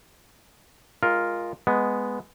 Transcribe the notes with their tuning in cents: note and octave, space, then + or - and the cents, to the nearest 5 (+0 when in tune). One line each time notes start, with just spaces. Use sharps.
G#3 -15 F4 +0 A#4 +0
G#3 +0 B3 +0